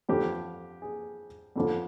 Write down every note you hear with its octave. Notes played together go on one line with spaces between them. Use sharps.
F2 D3 F3 G4
G#4
F2 D3 F3